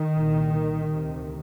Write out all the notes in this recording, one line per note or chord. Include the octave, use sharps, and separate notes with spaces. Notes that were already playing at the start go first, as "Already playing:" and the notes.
Already playing: D#3
C2 A#2
D2 C3